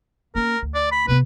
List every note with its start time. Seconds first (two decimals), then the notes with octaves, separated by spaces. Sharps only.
0.35 A#3 C#4 A#4
0.62 D2
0.74 D5
0.92 B5
1.08 C3 B3 B4